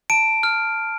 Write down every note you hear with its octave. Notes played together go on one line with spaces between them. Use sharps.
A5 D7
F6